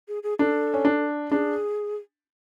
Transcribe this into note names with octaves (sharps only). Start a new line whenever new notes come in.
G#4
G#4
D4 A4
C#4
D4
D4 G#4